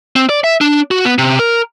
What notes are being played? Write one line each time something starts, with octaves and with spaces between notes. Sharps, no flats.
C4
D5
E5
D4
F#4
B3
C3
A#4